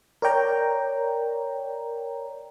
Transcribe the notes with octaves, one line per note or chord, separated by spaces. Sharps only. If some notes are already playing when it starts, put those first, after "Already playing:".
A#4 C#5 D5 G5 A#5